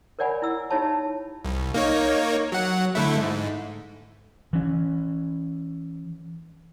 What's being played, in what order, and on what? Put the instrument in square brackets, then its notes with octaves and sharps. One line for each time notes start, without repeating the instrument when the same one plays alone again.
[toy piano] A#4 C#5 D5 F#5 G#5 B5
E4 E6
D#4 G4 C#5 E5 A5 B5
[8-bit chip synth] C2
A#3 D#4 C#5
F#3 F#5
D3 A3 E4
G#2
[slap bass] E3 C#4